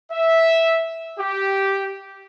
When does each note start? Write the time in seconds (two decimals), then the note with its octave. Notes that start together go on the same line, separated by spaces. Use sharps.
0.12 E5
1.19 G4